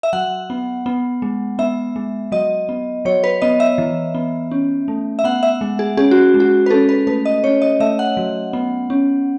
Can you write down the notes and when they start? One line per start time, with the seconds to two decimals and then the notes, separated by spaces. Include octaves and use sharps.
0.03 E5
0.13 F#3 F#5
0.50 B3
0.86 B3
1.22 G#3
1.59 B3 E5
1.96 G#3
2.32 F#3 D#5
2.69 B3
3.05 F#3 C#5
3.24 B4
3.42 B3 D#5
3.60 E5
3.78 E3
4.15 B3
4.51 C#4
4.88 A3
5.19 E5
5.24 B3 F#5
5.43 E5
5.61 G#3
5.79 G#4
5.97 C#4 G#4
6.11 F#4
6.34 G#3
6.40 F#4
6.66 B4
6.70 C#4 A4
6.89 B4
7.07 A3 B4
7.25 D#5
7.44 C#4 C#5
7.62 D#5
7.80 A3 E5
7.99 F#5
8.17 F#3
8.53 B3
8.90 C#4